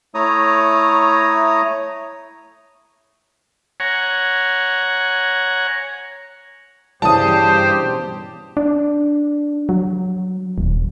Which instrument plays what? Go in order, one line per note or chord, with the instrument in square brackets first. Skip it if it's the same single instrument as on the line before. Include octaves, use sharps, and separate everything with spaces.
[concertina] A3 E4 C#5 A#5 D#6
[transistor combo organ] C#5 F#5 G#5 A#5
[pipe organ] G2 G4 C5 [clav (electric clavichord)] C#3 E3 G3 [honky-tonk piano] A5 D#6
[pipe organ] B2
[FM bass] D4
F#3
D#1